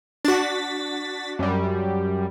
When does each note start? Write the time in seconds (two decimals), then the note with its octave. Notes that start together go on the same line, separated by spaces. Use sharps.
0.25 D4 F#4 A6 B6
1.39 F#2 G3